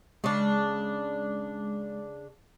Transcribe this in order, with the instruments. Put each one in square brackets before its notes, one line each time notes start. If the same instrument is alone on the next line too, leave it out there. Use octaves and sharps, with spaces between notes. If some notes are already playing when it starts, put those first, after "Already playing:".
[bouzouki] C#3 D4 [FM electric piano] G#3